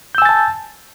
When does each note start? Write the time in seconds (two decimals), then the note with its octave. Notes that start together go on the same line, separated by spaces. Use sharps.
0.15 G6
0.18 E6
0.22 G#5
0.25 A6
0.29 A5